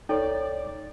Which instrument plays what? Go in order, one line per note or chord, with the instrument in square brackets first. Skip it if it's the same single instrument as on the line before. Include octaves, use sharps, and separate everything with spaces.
[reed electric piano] C2 C#5 G5 [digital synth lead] D#4 [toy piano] A4 [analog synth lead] D5